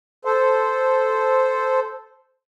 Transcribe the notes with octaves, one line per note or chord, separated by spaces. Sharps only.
A4 C5